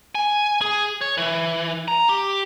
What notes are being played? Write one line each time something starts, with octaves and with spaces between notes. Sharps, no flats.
G#5
G#4
C#5
E3
A#5
G4